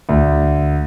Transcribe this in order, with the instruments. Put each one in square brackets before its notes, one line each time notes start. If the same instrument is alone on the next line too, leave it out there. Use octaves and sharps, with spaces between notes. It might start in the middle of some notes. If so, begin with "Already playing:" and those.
[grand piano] D2